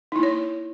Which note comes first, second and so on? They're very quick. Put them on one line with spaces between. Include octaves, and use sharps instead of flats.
D#4 E4 A#3 C#5